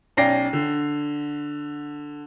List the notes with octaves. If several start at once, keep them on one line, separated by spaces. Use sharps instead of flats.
B1 C#4 D5 G5 A#6 C7
D3